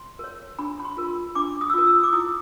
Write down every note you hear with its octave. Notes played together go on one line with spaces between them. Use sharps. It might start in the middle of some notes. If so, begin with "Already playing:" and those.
Already playing: C6
A#4 C#5
D4 B5
B5
C6
F4 A#4
D4 D6
D#6
E6
F4 A#4 D#6
E6
D6
E4 D#6